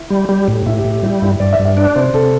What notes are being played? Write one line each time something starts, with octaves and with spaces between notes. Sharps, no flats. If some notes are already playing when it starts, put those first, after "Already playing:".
Already playing: E4
G3
G3 G4
G4
A2
G4
A2 E4
G4
A2
G4
G3 E4
G2 E4
G2 D5
E5
G2
E5
D4 D5
C3 C5
C3 A4